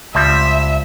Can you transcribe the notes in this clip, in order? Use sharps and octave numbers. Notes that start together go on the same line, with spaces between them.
C#2 F3 G3 C4 E5